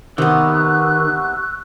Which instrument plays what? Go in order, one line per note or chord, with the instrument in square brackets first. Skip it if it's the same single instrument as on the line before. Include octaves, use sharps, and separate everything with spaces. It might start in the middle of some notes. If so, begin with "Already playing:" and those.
[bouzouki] C3 B3 [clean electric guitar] D#3 [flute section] C#6 E6 F#6